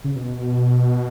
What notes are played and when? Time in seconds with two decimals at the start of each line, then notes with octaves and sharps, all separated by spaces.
0.04 C#3
0.16 B2